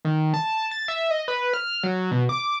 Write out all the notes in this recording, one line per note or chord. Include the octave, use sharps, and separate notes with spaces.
D#3
A5
A6
E5
D#5
B4
F6
F#3
B2
D6